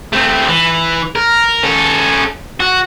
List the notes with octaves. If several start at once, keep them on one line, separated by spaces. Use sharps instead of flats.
A3 C4
E3
A#4
C#4 A4
F#4